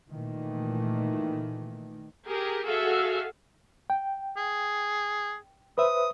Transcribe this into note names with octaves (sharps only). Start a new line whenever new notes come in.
A#2 D#3 E3 A3
G4 G#4 A#4
F#4 G#4 A4 E5 F5
G5
G#4
B4 C5 E5 D#6